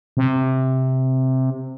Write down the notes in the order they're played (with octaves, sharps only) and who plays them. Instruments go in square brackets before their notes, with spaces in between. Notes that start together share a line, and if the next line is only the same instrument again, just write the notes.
[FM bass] C3